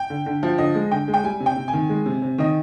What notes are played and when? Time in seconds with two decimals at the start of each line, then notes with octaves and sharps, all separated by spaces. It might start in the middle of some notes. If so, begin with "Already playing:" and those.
Already playing: G5
0.10 D3
0.26 D3
0.43 F3
0.58 D3 D#5
0.75 G#3
0.91 D3 G5
1.08 G#3
1.14 G5
1.24 G3 G#5
1.40 C3
1.46 G5
1.56 C3
1.68 G#5
1.73 D#3
1.89 G#3
2.06 C3
2.22 C3
2.38 D#3 D#5